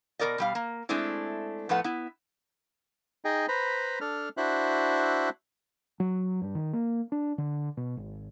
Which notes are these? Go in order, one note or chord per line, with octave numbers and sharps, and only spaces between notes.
B2 G3 A#4 D5 D#5
B2 G3 F5
A#3
G#3 A3 C4 D4 E4
A2 F3 A3 B3 B4 F#5
B3 E4
D#4 G#4 D#5 G5
B4 C5 A#5 B5
D4 A4 F6
D4 E4 F#4 C5 E5 F#6
F#3
G2
D#3
A#3
D4
D3
B2
G#1